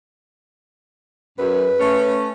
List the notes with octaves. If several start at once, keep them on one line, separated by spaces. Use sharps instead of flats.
F#2 B4
A3 C#4